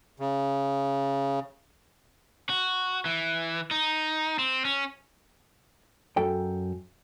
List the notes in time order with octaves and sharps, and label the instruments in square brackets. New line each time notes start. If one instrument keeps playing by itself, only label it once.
[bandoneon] C#3
[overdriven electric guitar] F#4
E3
D#4
C4
C#4
[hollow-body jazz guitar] F#2 A4 G5